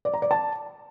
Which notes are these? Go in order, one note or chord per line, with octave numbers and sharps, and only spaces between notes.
D5
A#5
D5
A5